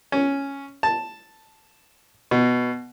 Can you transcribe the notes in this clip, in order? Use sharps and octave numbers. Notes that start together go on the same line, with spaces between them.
C#4
A5
B2